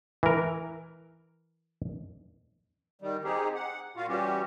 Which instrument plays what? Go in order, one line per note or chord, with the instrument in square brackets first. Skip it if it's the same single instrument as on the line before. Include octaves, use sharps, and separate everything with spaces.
[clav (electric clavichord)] E3 A#4
[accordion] D#3 G3
C4 D#4 G4 G#4
F#5
A#2 F4 F#4 F5
E3 G3 C#4 F#4 G4